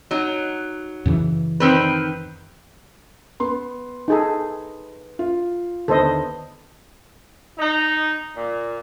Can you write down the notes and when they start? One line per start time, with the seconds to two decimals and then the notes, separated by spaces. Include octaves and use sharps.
0.11 F#3 D#4
1.06 F#2 C#3 E3
1.60 D#3 C4 B4
3.40 B3 C6
4.08 D#4 G#4 A4
5.19 F4
5.88 D#2 D3 B3 A4 C5 D#5
7.58 D#4
8.35 A#2